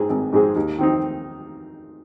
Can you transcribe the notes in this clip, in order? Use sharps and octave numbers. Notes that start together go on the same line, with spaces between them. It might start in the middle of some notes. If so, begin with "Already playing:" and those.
Already playing: G#2 G#3 C4 G#4
G#1
G#2 G#3 C4 G#4
D#2
D#3 C4 D#4